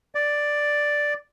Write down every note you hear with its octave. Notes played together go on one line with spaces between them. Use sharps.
D5